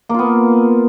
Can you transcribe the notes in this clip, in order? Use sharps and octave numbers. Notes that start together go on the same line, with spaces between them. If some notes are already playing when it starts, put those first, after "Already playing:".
A#3 B3 F4